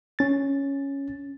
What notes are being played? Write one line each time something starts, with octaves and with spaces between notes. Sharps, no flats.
C#4 A6